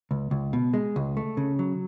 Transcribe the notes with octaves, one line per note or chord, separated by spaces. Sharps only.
C#2
C#2
B2
G#3
C#2
A3
C#3
F#3